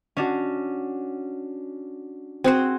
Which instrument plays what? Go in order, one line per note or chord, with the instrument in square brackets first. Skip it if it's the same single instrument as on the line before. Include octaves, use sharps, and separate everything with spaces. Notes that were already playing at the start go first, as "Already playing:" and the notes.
[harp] C#4 D4 F#4
[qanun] C4 F#4 C5 [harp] G#4